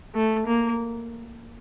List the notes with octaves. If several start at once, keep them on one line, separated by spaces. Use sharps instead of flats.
A3
A#3